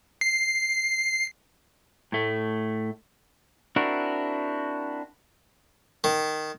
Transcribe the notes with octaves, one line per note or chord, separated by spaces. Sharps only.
C7
A2 A3
C4 D4 E4 F#4 A#4
D#3